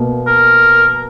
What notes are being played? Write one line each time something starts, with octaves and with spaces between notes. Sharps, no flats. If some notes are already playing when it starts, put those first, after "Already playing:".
Already playing: B2 A#3
A#4